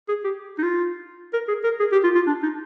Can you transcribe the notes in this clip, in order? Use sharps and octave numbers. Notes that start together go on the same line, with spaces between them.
G#4
G4
D#4
F4
A#4
G#4
A#4
G#4
G4
F4
F4
D4
D#4